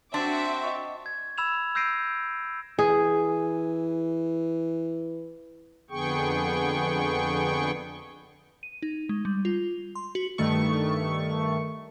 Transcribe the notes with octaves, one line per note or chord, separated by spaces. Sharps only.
C4 D4 F#4 E5 A5 C6 D6 A6
D#5 C#6
G#6
B5 E6 G#6 E7 F7
E6 G6 A#6 C7 D7 D#7
E3 G#4
F2 D3 B3 G#4 G5 C#6
D#7
D#4
G#3
G3
F4
C6
F#4
G2 D#3 A3 C#6